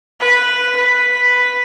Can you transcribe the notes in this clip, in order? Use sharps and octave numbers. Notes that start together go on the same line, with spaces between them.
B4
B4